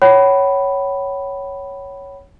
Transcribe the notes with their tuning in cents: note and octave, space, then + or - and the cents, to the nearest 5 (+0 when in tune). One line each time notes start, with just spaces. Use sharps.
C#5 +0 F#5 +45 B5 +0